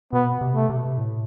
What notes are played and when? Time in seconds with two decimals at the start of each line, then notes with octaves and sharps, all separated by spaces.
0.13 B2 B3
0.41 C3
0.55 A3
0.69 C3
0.77 B2
0.84 C3
0.97 A2